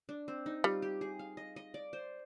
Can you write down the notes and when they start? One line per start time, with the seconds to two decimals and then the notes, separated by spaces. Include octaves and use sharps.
0.09 D4
0.28 C4
0.46 D#4
0.64 G3 F4
0.82 G4
1.01 G#4
1.19 F5
1.37 D#5
1.56 D#5
1.74 D5
1.93 C5